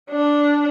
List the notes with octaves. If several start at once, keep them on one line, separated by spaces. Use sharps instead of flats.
D4